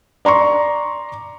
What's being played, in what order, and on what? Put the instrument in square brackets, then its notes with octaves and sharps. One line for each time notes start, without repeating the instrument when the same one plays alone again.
[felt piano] D5 A#5 C6 C#6